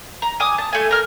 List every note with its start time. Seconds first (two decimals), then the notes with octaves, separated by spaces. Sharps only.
0.22 A#5
0.40 G#5 D6 D#6
0.58 A5
0.73 A3 G#5
0.91 A#4 F6